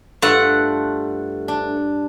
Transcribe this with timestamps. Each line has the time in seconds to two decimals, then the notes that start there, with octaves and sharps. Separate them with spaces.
0.22 G2 A3 F4 F#5
1.48 D4